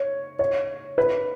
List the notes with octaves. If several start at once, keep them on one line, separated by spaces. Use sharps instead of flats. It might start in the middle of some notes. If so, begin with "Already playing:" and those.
Already playing: C#5
C#5
B4